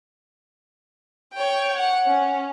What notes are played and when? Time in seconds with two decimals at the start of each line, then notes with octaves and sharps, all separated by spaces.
1.33 C#5 G5
1.76 F#5
2.06 C#4